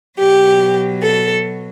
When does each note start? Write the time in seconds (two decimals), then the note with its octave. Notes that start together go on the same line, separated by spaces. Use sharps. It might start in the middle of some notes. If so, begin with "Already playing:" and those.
0.19 B2 F#3 G4
1.02 A4